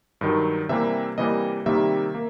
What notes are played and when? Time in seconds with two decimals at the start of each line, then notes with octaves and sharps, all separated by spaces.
0.21 G2 D#3 F#3
0.69 C3 E3 G3 A#3 E5
1.18 C3 E3 G3 A#3 D#5
1.66 C3 D#3 G3 A#3 E5
2.15 A#3